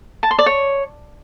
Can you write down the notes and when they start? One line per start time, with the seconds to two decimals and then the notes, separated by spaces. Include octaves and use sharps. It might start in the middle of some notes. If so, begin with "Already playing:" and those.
0.23 A5
0.31 C6
0.39 D5
0.46 C#5